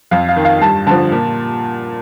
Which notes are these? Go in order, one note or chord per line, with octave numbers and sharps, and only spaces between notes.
F2 F5
F5
D#3
F5
G2 A5
D3 F3 A5
A#2